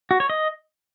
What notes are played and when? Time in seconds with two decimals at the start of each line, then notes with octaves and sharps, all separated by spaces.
0.11 F#4
0.20 C#5
0.30 D#5